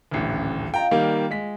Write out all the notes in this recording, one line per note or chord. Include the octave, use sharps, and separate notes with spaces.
D#1 A1 D2
F4 D#5 G5 A#5
D#3 G3 A#3 D#5
G#3 B6